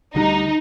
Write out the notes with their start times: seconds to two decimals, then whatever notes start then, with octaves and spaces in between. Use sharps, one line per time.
0.14 D2 D3 G3 D4 D#4